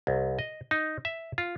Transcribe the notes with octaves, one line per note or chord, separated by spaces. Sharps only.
C2
D#5
D#4
E5
F4